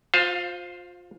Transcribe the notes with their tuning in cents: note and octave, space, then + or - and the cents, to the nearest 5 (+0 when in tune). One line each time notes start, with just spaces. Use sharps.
F4 +30 C5 +0 F5 +0